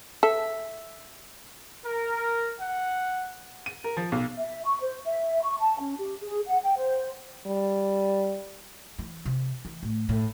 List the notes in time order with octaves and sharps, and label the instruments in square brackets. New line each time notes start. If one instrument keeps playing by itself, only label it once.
[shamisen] A4 [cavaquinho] E5
[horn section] A#4
F#5
[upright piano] D#7
A#4
F3
B1
[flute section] E5
C#6
C5
E5
C#6
A5
C#4
G4
G#4
F#5
G5
C5
[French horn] G3
[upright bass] E3
C3
E3
A2
A2